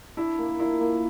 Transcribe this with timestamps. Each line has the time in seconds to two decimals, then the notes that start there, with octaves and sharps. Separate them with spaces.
0.17 D4 E4
0.39 A#3
0.60 E4 F4
0.81 A#3